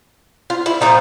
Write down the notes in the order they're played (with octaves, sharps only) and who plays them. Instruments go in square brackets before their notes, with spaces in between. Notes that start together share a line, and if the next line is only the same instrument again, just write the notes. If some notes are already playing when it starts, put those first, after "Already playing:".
[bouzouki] F4
E4
A#2 F3 A#3 D#4